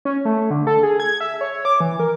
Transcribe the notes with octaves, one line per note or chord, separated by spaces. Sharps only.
C#4
A3
D3
A4
G#4
G#6
E5
C#5
D6
E3
A#4